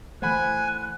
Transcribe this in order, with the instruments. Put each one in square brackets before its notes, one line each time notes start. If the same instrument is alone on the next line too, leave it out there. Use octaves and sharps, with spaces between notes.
[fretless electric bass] E3 A3 [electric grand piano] C5 F#5 B5 [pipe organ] G#5 [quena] F#6